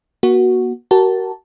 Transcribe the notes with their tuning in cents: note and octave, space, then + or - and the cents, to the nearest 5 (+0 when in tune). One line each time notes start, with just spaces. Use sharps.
A#3 +45 F#4 +0
F#4 +35 A#4 +0 A5 +0